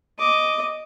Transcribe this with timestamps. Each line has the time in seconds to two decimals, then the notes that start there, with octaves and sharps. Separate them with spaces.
0.19 D#5 D6